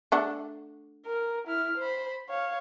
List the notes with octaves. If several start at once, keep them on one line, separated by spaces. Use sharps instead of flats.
A3 D4 F#5
A#4
E4 F6
C5 B5
C#5 F5